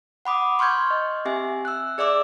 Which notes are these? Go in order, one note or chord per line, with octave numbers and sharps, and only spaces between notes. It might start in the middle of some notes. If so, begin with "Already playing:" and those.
F#5 B5 D6 D#6
C6 C#6 F6 G6 G#6
D#5
C4 G4 E5 G#5
E6 F#6
G#4 D5 E5 D6 E6